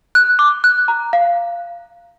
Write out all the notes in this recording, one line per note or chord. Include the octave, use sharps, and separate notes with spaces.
F#6
D6
F#6
A#5
F5